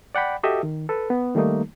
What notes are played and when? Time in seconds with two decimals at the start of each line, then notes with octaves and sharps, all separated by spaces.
0.15 D5 F#5 G5 B5
0.43 F#4 G4 A4 D#5 E5
0.63 D#3
0.89 A4 B4
1.10 B3
1.35 D#3 G3 A3 A#3 D#4